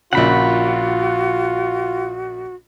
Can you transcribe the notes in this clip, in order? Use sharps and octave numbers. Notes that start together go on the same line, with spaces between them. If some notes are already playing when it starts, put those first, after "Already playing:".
A#1 A#2 C#3 F4 F#4 F#5 B5